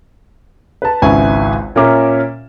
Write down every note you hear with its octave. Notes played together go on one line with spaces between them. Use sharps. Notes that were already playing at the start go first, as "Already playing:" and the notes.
B4 A5
G#1 C#2 E4 B4 G#5 C#6
A#2 C#4 A#4 E5 D6